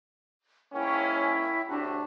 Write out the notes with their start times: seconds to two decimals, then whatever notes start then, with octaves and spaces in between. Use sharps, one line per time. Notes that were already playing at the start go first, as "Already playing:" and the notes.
0.73 G#2 A#3 C#4 E4 G5 C#6
1.69 A2 C3 D4 F#4 A5